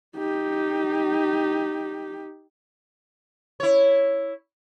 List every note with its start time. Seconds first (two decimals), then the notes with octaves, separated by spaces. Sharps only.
0.16 D#4 G4
3.60 E4 C#5